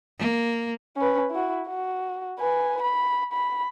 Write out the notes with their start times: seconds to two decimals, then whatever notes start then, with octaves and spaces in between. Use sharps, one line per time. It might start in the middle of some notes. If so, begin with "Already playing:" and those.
0.19 A#3
0.97 C#4 B4
1.31 E4 F#4
1.68 F#4
2.39 B4 G#5
2.82 B5
3.32 B5